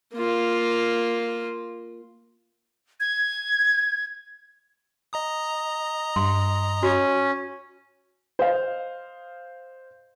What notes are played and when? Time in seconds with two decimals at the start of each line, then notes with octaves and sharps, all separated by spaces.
0.14 A#3 F4
3.00 G#6
5.13 D#5 A#5 D#6
6.16 G2 C6
6.83 C#4 F#4 D6
8.39 C5 D#5 F5